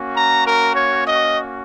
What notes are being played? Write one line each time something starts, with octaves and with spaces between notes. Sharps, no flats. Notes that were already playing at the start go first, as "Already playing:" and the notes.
Already playing: A#3 C#4 F#4
A#5
A#4
C#5
D#5